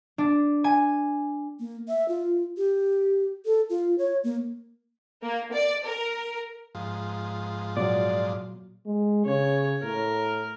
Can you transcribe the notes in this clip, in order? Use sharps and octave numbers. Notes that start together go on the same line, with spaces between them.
D4
G#5
A#3
E5
F4
G4
A4
F4
C#5
A#3
A#3
D5
A#4
G#2 F3
A#2 F#3 D5
G#3
C#3 C#5
A2 A#4